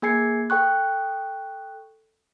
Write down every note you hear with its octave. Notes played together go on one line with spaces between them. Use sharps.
A#3 G#4 G#5 G#6 C7 C#7
A4 G5 C#6 F#6